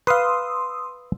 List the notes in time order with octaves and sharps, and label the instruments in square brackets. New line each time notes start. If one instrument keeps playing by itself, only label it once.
[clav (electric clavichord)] B4 F5 [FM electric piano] C6 D#6 E6